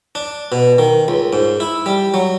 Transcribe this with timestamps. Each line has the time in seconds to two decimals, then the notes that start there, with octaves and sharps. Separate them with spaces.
0.15 D4
0.52 B2
0.78 D#3
1.08 C#2
1.33 G#2
1.60 E4
1.86 G3
2.14 F#3